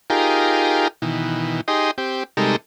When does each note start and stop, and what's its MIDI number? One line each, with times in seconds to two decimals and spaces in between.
0.10 0.88 63
0.10 0.88 65
0.10 0.88 67
0.10 0.88 68
0.10 0.88 70
1.02 1.61 47
1.02 1.61 51
1.02 1.61 52
1.68 1.91 63
1.68 1.91 67
1.68 1.91 68
1.68 1.91 75
1.68 1.91 84
1.98 2.23 60
1.98 2.23 67
2.37 2.56 48
2.37 2.56 55
2.37 2.56 56
2.37 2.56 63
2.37 2.56 69
2.37 2.56 70